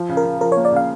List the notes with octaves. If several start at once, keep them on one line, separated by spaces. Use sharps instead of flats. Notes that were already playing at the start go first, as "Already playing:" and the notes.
Already playing: F3
C#3
A#4
C#3
F3 A#4
A#3 C#5
D5
C#3 F5